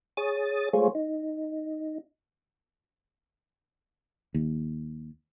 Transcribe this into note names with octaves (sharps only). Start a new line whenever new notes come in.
G#4 C#5 D#6 A6
G#3 A3 F4 G#4 C5 C#5
D#4
D#2